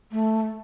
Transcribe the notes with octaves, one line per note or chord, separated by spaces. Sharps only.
A3